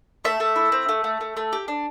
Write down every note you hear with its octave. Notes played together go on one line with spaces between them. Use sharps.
A3 E5
A3
E4
C4
A3
A3
A3
A3
G4
D4